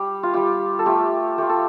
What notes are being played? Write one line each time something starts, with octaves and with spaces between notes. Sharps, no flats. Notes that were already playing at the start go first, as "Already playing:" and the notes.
Already playing: G3 G4
F4
G3 F4 G4
A4
A3 F4 G4
A3 F4 G4
A4